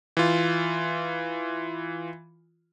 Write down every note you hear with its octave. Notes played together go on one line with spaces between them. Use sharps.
E3 F4